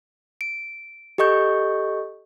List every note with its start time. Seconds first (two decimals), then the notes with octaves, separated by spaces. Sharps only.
0.41 D7
1.18 G4 A4 D#5 C#6 G6